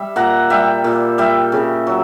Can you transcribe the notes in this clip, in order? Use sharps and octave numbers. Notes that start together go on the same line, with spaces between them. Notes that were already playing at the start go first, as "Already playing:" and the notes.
Already playing: G3 E5
A#2 F#5 A#5
G3 E5 G5
A#2
G3 E5 G5
C#3
F#3